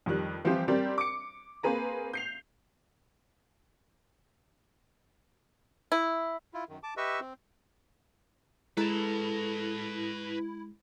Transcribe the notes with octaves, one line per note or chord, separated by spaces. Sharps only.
F2 D#3 G3 F#6
E3 F3 G3 C4 F4 G4
G3 C4 G4 A#4 D5
D6 C#7
A#3 C4 G#4 B4 A#5
G6 C7 F7
E4
E4 F4
F#2 D#3
A5 D6
G4 B4 D#5 E5 C#6 E6
C4
G#3 E4 A4 B4 A5 A#5